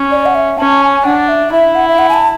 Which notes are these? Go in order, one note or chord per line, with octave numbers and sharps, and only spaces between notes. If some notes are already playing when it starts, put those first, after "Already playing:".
Already playing: C#4
D5
F#5
E5
C#4 A5
G#5
D4 F#5
E5
E4 E5
F#5
E5
F#5
G#5
A5